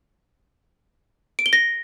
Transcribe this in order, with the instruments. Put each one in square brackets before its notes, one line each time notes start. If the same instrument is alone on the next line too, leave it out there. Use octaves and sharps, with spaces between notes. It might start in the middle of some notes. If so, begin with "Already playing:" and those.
[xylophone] D7
G7
A#6